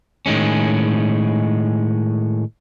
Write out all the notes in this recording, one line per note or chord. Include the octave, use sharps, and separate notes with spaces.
A2 D#3 G#3 C#4